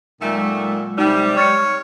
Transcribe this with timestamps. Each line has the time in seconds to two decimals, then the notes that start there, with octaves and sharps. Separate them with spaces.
0.21 A#2 D#3 F#3 G#3 A3 E6
0.98 C3 G3 D#4
1.37 C#5 F6 A6 C#7